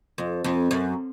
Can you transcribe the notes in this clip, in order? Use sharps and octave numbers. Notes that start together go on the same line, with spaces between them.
F2
F2
F#2